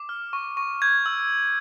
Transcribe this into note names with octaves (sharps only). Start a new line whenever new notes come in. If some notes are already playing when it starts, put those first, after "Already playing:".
Already playing: D6
F6
C#6
C#6
G6 G#6
E6